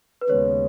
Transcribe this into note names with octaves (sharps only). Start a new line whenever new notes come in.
B4
D#2 C#3 G#3 B3 C#5